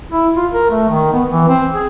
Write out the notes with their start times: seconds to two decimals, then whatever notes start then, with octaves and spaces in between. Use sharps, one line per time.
0.12 E4
0.36 F4
0.53 A#4
0.70 A3
0.89 D#3
1.13 B3
1.31 E3
1.48 C4
1.75 G#4